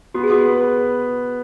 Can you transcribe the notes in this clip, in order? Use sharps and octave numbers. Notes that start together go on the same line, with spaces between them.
B3 F#4
G#4
B3 F#4
B4
B4